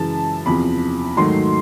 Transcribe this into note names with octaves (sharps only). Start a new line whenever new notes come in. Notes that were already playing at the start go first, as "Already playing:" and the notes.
Already playing: F#2 C#3 E3 G#3 A5
E2 C3 F3 B5
G#2 D#3 F#3 A3 C6